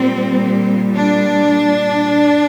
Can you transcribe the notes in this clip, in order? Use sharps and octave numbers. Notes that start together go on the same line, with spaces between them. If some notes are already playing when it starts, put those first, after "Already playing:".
Already playing: A#2 G3 C4
D4